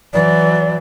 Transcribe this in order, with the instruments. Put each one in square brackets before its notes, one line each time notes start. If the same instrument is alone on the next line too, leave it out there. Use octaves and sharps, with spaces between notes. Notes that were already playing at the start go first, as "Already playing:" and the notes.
[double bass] E3 F#3 [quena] D5